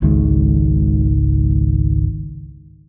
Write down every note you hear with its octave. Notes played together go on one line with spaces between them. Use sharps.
G#1 C#2 D#3 G#3